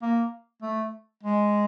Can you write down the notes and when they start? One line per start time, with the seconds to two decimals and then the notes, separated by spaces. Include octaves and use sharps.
0.02 A#3
0.62 A3
1.23 G#3